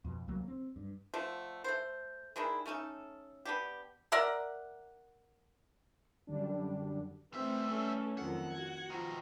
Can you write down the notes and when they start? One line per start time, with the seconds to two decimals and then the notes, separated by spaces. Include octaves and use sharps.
0.04 F2 B2
0.27 C2 C#3 F#3 A#3
0.48 C4
0.76 G2
1.14 D3 F3 A3
1.64 A3 C5
2.36 D#3 G#3 D4 E4
2.66 A3 C#4 D#4 A4
3.45 B3 D4 G4
4.12 A#4 D5 E5 F#5
6.27 F#2 D3 G3 D4
7.34 E3 G3 A3 C4 E5
7.70 C#4 A4
8.18 F2 D#3 F#3 A4 F#5
8.54 F#4 G#6
8.90 B2 D#3 F3 A#5